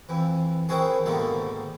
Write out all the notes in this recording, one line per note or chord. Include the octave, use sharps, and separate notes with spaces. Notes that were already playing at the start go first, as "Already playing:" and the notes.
F2 E3
D#3 C4 D#4 E4 F#4 G#4
G#2 B2 D3 D#3 A#3